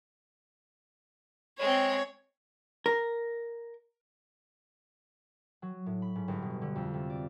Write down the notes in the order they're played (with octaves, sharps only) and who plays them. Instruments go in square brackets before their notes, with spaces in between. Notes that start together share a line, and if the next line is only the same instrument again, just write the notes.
[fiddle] G#3 C4 [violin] C#5
[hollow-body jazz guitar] A#4
[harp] F#3
A2
B5
G#2
G1
B2
D3
F2
C3
D5